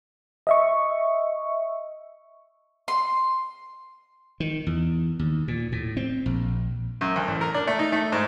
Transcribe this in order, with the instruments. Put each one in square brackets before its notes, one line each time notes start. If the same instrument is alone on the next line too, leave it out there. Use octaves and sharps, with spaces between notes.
[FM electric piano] D#5 E5 C#6
[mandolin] C6
[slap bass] D#3
E2
D#2
A#2
A2
C4
A#1
[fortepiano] F#2
D2
A1
A#4
D4
A3
D#4
A3
G#2